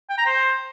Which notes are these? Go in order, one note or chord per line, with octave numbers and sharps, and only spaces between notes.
G5
A#5
C5